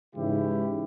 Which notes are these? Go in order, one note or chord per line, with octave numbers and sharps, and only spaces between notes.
G#2 C#3 E3 G#3 E4 G4